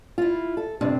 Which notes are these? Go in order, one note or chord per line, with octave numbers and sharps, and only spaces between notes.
E4 F4
A4
G2 C3 C4 D4